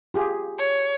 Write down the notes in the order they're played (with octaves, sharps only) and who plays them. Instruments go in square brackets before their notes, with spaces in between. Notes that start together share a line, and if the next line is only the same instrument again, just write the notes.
[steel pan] F4 G4 G#4
[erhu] C#5